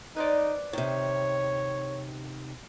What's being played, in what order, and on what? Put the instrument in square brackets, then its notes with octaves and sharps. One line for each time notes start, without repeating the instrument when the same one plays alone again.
[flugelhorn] D#4 [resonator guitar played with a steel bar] B4 C5 D5
[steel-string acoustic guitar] C3 D#3 [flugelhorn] C#5